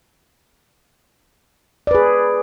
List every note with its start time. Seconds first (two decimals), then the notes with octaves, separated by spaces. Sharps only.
1.87 D5
1.91 B4
1.95 G#4